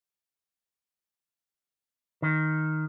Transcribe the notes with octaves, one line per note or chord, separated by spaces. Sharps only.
D#3